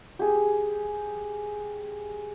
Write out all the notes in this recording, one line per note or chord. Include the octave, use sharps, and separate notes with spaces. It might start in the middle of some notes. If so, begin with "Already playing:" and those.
G4 G#4